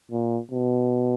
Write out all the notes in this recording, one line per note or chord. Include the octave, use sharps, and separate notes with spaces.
A#2
B2